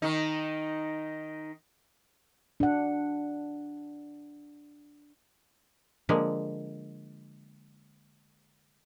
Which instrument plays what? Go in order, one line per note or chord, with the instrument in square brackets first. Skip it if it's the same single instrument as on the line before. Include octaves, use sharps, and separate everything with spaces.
[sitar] D#3 D#4
[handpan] D4 F#5
[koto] D3 F3 G#3 A#3